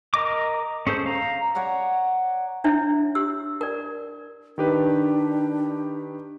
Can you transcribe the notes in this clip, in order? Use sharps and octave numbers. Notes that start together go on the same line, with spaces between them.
A#4 D#5 D6
C#4 G#4 A4 C5
F5 A#5
C#5 D5 F#5 A#5
D4 E4 C#5 E5
G4 E6
A#4 D5
D#3 D4 G4 B4